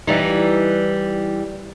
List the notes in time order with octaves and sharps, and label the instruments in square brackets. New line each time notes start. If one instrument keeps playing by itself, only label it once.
[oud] E3 G3 D#4